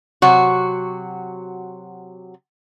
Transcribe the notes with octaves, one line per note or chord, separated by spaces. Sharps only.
C3 F#3 F#4